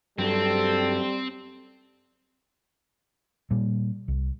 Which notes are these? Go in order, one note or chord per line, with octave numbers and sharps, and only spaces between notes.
G2 F#3 G3 C4 A4
A#2 G3
C2